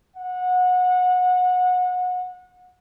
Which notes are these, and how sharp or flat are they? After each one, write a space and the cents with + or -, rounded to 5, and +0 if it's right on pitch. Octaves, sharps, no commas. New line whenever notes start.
F#5 -25